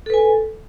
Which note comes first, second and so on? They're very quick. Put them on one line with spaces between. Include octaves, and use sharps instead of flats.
A4 B4 G#5